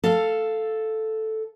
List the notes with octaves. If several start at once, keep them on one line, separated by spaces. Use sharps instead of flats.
A4 F5